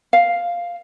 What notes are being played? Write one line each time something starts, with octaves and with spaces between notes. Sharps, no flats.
F5